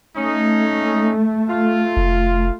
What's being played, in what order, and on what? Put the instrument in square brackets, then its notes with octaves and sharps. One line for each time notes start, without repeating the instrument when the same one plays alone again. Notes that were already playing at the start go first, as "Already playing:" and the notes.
[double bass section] A3 [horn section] C#4 D#4
[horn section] F4
[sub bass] F1